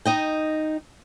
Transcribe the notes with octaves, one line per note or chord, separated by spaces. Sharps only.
D#4 D#5 G5